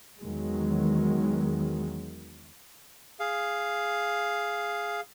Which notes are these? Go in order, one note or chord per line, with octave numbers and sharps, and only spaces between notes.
E2 D#3 F#3 G#3
G#4 F5